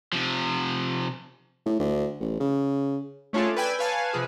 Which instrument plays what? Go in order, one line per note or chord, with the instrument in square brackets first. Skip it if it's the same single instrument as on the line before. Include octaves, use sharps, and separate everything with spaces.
[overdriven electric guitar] C3 F3
[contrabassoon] A2
D2
A1
C#3
[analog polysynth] A3 C#4 D4 F4 G#4 A4
B4 D5 G5 G#5 E6
B4 C#5 F5 G#5 A5
C3 F3 G#4 B4